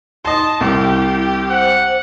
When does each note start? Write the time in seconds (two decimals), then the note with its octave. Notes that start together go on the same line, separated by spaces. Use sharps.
0.25 D#4 D#5 A5 C6
0.61 C2 E4 G4
1.49 C5 F#5